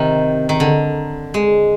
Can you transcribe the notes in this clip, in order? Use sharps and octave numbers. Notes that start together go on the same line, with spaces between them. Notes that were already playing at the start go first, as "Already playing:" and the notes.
Already playing: C3 D#3
D#3
D3
G#3